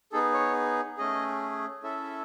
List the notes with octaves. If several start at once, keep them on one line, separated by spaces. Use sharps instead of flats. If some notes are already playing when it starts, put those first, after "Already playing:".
B3 D#4 G#4 A4
C#5
A3 C#4 G#4 D#5
C#4 E4 A4 E5